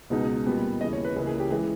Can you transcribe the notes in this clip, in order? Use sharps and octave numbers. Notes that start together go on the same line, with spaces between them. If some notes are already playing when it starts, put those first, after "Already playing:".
C#2 B2 G#3 D#4
A#2 G3 B3
D#2 C#3 E3 D#5
C#5
B4
C#2 C#3 E3 A#3 G#4
G#4
G4
E3 G#3 G#4